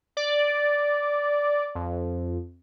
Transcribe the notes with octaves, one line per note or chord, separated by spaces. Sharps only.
D5
F2